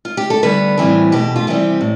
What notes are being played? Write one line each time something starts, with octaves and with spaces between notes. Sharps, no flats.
F4
G4
A4
D2 D3 G3 B3 B4
A2 E3 G3 C4
E2 B2 A3 G4
F4
C3 E3 G3 C4 G4
A2